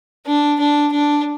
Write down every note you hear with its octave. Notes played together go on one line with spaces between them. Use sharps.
D4
D4
D4